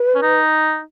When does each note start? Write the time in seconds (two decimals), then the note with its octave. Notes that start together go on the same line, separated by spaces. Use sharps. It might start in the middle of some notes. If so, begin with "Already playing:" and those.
Already playing: B4
0.15 C#4
0.22 D#4